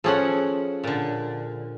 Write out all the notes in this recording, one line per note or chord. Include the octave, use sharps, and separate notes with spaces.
F3 C#4 G#4 A4 F#5
A#2 D3